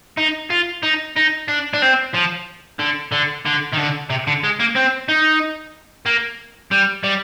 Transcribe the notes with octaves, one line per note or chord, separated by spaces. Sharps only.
D#4
F4
D#4
D#4
D4
D4
C4
F3
D3
D3
D3
D#3
D3
C3
D3
G#3
A#3
C4
D#4
A#3
G3
G3